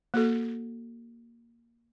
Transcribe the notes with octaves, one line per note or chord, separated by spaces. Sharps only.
A#3 F#4 A4